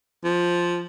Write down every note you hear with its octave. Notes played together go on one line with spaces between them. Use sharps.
F3